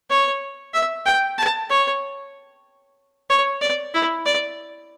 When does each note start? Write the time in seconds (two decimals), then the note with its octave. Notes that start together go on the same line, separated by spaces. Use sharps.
0.10 C#5
0.74 E5
1.06 G5
1.38 A5
1.70 C#5
3.30 C#5
3.61 D5
3.94 E4
4.26 D5